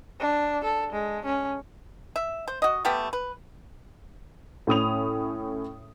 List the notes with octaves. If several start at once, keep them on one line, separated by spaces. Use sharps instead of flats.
D4
A4
G#3
C#4
E5
C5
F#4 D#5
G3 A3 B3 G4
B4
A2 C#4 D#6 F7